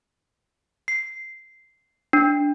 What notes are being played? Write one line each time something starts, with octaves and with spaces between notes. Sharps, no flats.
C7
D4